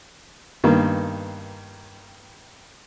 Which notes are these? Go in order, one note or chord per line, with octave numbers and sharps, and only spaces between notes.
G2 D#3 A#3 B3